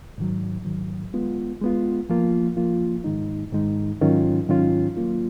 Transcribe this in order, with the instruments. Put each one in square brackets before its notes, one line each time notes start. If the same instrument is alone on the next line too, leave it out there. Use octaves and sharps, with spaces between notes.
[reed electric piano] G#2 D#3 F#3
G#2 D#3 F#3
G#3 B3 F4
G#3 B3 F4
F3 A#3 F4
F3 A#3 F4
G#2 D#3 G#3 D#4
G#2 D#3 G#3 D#4
G#2 D#3 F#3 C#4 F4
G#2 D#3 F#3 C#4 F4
F#3 A#3 F4